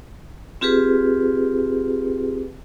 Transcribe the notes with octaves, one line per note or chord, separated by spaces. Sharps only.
C4 F4 G4 G#4 B4